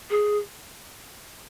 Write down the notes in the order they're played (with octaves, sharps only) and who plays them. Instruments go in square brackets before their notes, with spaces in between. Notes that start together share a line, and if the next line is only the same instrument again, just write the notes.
[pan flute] G#4